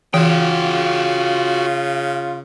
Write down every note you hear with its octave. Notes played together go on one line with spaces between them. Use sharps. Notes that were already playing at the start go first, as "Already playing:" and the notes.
C#3 E3 F4 F#4 G5